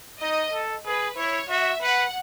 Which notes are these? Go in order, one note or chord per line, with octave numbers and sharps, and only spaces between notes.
D#4 D#5
A4
G#4 B4
E4 C#5
F#4 E5
B4 F#5